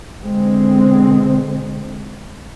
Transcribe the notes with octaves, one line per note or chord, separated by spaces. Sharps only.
B2 D3 G#3 C4